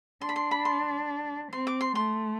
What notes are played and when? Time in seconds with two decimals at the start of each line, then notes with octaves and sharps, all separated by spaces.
0.21 D4 C6
0.29 B5
0.36 C6
0.51 B5
0.65 C6
1.52 C4 C6
1.67 D6
1.81 C6
1.95 A3 C6